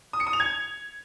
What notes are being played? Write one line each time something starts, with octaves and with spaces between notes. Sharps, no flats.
D#6
C#7
D#6
F7
G#6